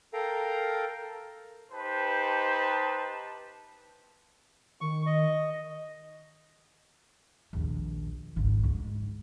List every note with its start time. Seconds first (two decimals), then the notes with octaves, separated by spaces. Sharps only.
0.13 A4 A#4 F5 G5 A#5
1.72 D#4 G4 B4 C5 A5
4.81 D#3 C#6
5.06 D#5
7.53 A#1 D#2
8.36 G#1 C#2
8.64 G#2